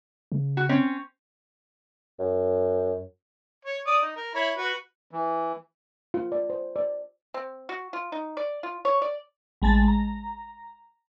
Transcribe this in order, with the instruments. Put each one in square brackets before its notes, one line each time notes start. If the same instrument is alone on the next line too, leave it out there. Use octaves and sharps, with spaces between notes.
[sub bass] C#3
[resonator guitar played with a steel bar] F#4
C4 C#4 C#5
[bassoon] F#2
[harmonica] C#5
D5 D#6
D#4
A#4
E4 C#5 B5
F#4 B4
[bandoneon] E3
[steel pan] F4
D5
C5
D5
[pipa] C4
F#4
F4
D#4
D5
F4
C#5
D5
[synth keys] A1 G#3 A5 A6
A#5